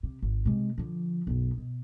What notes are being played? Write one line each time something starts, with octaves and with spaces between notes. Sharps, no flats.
C3
G#1
C3 G#3
D3 F3
B1 F#2
B2